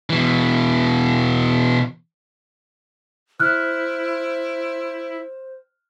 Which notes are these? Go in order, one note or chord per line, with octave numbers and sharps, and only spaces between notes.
B2 E3
E4 C5 F6 F#6